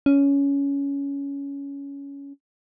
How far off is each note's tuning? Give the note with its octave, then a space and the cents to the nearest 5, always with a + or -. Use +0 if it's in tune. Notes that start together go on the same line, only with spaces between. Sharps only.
C#4 +15